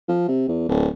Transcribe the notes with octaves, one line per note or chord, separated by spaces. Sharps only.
F3
C3
E2
D1